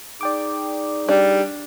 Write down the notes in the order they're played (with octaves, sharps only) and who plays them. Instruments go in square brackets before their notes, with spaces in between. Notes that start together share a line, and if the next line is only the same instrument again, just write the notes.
[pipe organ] D#4 G#4 [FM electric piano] D5 G5 D6
[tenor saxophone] G3 [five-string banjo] D4